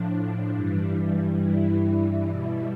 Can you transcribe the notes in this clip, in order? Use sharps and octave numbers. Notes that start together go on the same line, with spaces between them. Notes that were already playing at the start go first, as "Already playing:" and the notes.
Already playing: A2 F3 D4
G2 E3 G3
E4
B2 G3